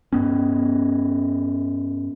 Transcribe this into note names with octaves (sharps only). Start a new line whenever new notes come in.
G2 B3 C#4